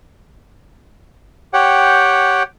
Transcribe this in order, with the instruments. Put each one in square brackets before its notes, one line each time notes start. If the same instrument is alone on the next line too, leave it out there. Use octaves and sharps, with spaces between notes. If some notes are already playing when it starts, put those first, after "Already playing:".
[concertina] G4 C#5 F#5 G5